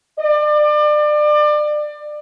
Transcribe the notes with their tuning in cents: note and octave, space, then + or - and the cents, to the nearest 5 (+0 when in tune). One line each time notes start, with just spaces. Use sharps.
D5 +30